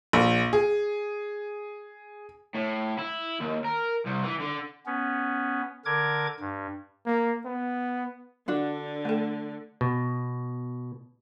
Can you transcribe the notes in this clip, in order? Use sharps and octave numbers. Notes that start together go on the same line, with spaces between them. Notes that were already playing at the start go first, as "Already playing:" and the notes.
A#1
G#4
A2
E4
D#2
A#4
C2
E3
D3
B3 C#4
D3 A#4 D6 G#6
G2
A#3
B3
D3 D4 F#4
A3 A4
B2